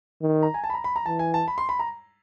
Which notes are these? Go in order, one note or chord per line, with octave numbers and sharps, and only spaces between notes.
D#3
A#5
G#5
A5
B5
A#5
B5
A#5
E3 A5
G#5
A5
B5
C6
B5
A#5